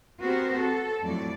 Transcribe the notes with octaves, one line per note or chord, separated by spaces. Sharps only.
B3 C4 F#4 G4 A#4 C5
A4
F2 A2 F#3 D5